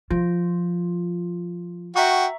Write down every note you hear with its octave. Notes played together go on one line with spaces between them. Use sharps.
F3 F4
F#4 E5 G5 A#5 C#6